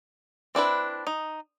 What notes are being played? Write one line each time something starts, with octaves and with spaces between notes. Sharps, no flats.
C4 D4 E4 B4
D#4